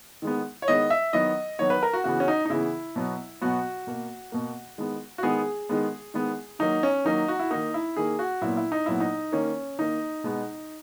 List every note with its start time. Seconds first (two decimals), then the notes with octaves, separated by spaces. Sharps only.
0.22 D#3 G#3 B3
0.62 C#5
0.68 D#3 G#3 B3 D#5
0.90 E5
1.13 D#3 F#3 B3 D#5
1.59 D#3 F#3 B3 C#5
1.70 B4
1.83 A#4
1.93 F#4
2.04 C#3 E3 B3 F#4
2.20 C#4
2.28 D#4
2.46 D#4
2.50 C#3 E3 B3 E4
2.96 B2 F#3 B3
3.41 B2 F#3 B3 F#4
3.87 B2 A#3
4.32 B2 A#3
4.78 D#3 G#3 B3
5.18 F#4
5.23 D#3 G#3 B3 G#4
5.69 D#3 G#3 B3
6.14 D#3 G#3 B3
6.59 D#3 F#3 A#3 D#4
6.83 C#4
7.05 D#3 F#3 A#3 D#4
7.28 F#4
7.39 E4
7.50 D#3 A#3 D#4
7.74 E4
7.97 D#3 A#3 G#4
8.19 F#4
8.41 A#2 F#3 B3 E4
8.57 E4
8.72 D#4
8.86 A#2 F#3 B3 E4
9.00 D#4
9.32 D#3 A#3 C#4
9.79 D#3 A#3 D#4
10.24 B2 G#3 B3